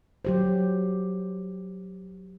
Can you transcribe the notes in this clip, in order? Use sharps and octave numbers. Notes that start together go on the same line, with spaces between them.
F#3 G4 C5